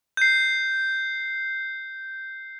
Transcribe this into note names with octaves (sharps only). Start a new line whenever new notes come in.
G6 C7